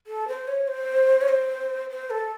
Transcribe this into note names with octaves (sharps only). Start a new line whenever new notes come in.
A4
C5
C#5
C5
C#5
C5
C5
A4